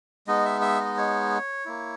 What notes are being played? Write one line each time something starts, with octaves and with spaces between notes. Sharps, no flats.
G#3 B3 D#4 D#5
E5
E5
D#5
C#5
A#3 E4